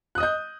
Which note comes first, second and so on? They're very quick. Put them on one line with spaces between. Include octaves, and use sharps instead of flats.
F#6 D#6 D#5 G6